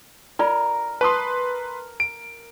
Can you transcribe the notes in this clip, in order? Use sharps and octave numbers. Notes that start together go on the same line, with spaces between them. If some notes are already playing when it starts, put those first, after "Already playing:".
F4 A#4 D5 B5
B4 A5 C6 C#6 D#6
D7